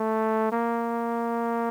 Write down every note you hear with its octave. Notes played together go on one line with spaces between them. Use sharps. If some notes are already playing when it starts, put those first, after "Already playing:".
Already playing: A3
A#3